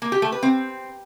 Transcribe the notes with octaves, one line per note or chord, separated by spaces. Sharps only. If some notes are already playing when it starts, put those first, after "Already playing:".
A#3
G4
A3
B4
C4